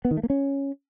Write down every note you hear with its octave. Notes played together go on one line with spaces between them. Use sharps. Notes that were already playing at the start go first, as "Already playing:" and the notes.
B3
D#3
A3
A#3
C#4